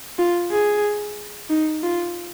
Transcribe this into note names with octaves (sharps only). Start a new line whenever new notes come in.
F4
G#4
D#4
F4